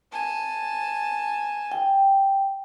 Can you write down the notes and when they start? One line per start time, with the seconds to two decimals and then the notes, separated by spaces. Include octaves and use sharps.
0.12 G#5 A5
1.72 G5